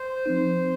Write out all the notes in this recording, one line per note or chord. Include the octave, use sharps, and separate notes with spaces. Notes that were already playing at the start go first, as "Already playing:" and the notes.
Already playing: C5
F3 C4 D#4